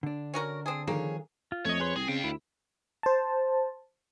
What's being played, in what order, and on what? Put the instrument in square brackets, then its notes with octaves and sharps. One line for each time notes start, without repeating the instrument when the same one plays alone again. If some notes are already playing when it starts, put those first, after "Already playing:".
[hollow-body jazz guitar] D3 D4
[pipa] C#4 F#4 A#4
[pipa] C4 G#4 [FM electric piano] A5
[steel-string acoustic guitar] F2 G#4 C#5 [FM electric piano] D#3 [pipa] A#3
[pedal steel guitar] F4
[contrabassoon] F2 [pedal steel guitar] A3 D#5 [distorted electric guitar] C#5
[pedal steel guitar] G#4 B4 C6
[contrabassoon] C2 [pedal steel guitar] C4 [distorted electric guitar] G#4
[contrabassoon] C#3 [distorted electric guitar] F5 G5
[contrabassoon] D2 [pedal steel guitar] E4
[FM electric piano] C5 A5